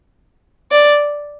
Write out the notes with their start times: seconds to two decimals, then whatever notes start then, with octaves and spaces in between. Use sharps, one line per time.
0.72 D5